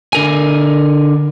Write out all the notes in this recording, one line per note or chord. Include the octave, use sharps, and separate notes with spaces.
D3 A#4 G#5